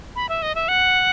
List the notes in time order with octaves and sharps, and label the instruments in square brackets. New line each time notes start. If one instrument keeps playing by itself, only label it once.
[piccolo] B5
E5
D#5
E5
F#5